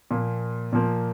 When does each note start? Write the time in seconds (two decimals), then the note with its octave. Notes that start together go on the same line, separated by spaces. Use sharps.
0.11 A#2 F3 A#3
0.73 A#2 F3 A#3